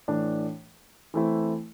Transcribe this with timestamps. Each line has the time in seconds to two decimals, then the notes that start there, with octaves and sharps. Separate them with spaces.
0.08 A2 E3 A3 D4
1.14 E3 A3 C4 E4